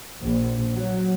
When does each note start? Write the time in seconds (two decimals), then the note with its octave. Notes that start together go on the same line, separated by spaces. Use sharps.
0.22 A#1
0.74 F#3